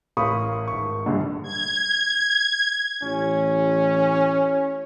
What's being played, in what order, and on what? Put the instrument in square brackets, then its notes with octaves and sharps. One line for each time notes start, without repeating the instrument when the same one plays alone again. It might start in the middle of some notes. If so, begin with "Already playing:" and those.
[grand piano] A1 A#4 F5 B5 C#6 D#6
G#1 C#6
A#1 G2 D3
[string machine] G#6
[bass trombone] A1 [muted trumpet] C#4